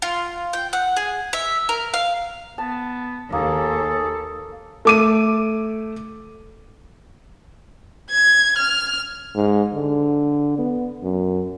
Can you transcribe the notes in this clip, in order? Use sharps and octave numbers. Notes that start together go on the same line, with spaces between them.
F4
G5
F#5
G#4
E5
A#4
F5
B3 A5
D#2 A#3 G#4 A4
A3 D6 D#7
G#6
F6
G#2
D3
B3
F#2